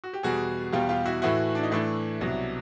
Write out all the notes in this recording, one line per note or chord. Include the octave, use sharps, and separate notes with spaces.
F#4
G4
E2 B2 G3 F#4 G#4
E2 B2 G3 F4 G4
F4 G4
E4 F#4
A2 E3 A3 E4 F#4
D4
D#4
A2 E3 A3 D4 E4
C2 B2 F#3